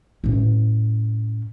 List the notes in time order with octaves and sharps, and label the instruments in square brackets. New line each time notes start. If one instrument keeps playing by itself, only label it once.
[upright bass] A2 C#4